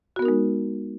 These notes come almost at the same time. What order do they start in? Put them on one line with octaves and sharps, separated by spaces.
F#4 B3 A#4 D#4 G#3